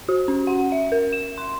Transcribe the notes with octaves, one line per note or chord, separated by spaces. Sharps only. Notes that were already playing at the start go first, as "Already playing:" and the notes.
F#4
C#4
F#5
E5
A#4
E7
C6